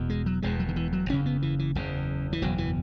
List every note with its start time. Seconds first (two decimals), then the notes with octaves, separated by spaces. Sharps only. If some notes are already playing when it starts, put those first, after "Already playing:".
Already playing: E1 E2 B2
0.10 G#3
0.26 F#3
0.42 E1 E2 B2 G#3
0.60 F#3
0.68 D#3
0.76 E3
0.93 F#3
1.09 F#1 E2 C#3 C#4
1.26 B3
1.42 E3
1.59 E3
1.75 F#1 E2 C#3
2.33 E3
2.42 F#1 E2 B2 F#3
2.58 E3